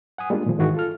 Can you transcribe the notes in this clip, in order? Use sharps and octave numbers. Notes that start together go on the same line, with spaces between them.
F#5 G#5 D#6
G3 G#3 A#3 D4 F4
A#2 D#3 F3 G#3
G#2 D#3 E3 E4 F#4 G#4
F4 A4 F6